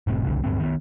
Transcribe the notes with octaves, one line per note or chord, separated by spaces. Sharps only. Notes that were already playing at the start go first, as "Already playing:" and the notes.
F#1 A2 C3 C4
F#1 C2 D3
D1 G2 D3 C4
D#3 B3